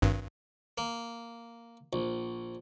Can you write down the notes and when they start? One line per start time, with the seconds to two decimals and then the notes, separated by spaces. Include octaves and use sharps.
0.02 G#1 G2
0.78 A#3
1.93 A#1